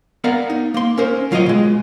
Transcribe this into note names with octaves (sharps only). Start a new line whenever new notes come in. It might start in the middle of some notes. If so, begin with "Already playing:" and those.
B3 A#4 D5 F5 F#5 A#5
D#4
A#3 C6
C#4 A#4 C5
C#2 F#3 F4 G4 D#5 G5
B2 G#3